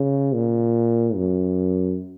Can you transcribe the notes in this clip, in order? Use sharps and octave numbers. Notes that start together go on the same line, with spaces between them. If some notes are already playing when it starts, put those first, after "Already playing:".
Already playing: C#3
A#2
F#2